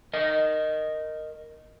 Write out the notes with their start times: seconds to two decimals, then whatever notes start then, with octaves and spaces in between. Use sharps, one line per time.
0.14 A#4 D#5